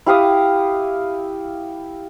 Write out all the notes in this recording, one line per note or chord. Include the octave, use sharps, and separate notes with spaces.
E4 G4 F5 D#6